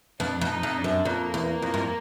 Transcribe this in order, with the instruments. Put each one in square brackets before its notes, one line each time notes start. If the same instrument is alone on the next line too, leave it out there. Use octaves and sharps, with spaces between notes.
[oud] F2 [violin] D4
[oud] F2
[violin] D#4
[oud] F2
[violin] D4
[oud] F#2
[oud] F2 [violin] A#3
[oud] E2
[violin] A#3
[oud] F2
G2